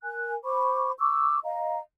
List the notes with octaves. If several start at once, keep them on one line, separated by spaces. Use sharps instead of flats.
A#4 G#5 F#6
C5 B5 C#6 D6
C#6 D6 E6
D#5 F5 A#5